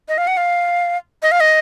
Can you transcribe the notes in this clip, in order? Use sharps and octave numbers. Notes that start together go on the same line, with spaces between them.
D#5
F5
F#5
F5
D#5
F5
D#5